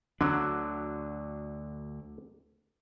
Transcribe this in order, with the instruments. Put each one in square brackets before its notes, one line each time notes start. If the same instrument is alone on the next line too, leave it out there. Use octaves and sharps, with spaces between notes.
[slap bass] D2 D4 [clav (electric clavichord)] D3 F#3